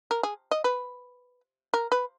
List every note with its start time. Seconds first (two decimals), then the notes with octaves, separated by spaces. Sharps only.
0.11 A#4
0.23 G#4
0.51 D#5
0.64 B4
1.74 A#4
1.92 B4